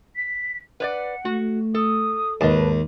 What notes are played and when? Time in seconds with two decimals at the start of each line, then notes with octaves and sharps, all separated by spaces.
0.16 B6
0.80 B4 C#5 D5 F#5
1.25 A3 F#4
1.74 A4 D#6
2.41 D#2 G#2 B4 D#5 A5